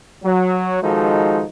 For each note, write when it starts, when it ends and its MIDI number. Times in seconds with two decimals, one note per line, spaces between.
0.24 0.81 54
0.82 1.44 51
0.82 1.44 53
0.82 1.44 56
0.82 1.44 63
0.82 1.44 66
0.82 1.44 69